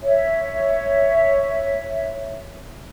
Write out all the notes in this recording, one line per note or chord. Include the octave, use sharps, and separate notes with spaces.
C#5 E5